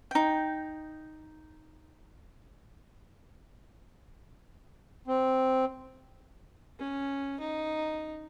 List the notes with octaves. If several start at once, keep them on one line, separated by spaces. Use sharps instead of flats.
D#4 G5
C4
C#4
D#4